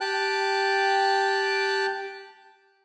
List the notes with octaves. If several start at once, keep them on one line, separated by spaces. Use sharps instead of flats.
G4 G5 A5 F#6